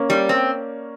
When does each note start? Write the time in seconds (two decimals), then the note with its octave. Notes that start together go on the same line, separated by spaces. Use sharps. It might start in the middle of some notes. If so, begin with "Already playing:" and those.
Already playing: A#3 C#4
0.10 G3
0.29 C4